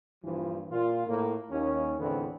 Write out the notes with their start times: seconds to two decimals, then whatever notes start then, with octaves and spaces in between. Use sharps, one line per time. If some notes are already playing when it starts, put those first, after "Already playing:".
0.24 A#1 G2 E3 F3
0.71 A#2 F4
1.07 A2 A#3
1.51 D#2 C#4
1.99 E2 A2 D3 F3 B3 C4